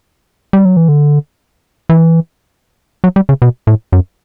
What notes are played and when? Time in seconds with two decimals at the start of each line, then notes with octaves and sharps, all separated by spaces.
0.53 G3
0.65 F#3
0.77 E3
0.88 D3
1.89 E3
3.04 F#3
3.16 G3
3.29 C#3
3.42 B2
3.67 A2
3.92 F#2